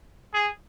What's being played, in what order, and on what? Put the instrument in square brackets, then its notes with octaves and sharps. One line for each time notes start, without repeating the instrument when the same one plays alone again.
[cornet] G#4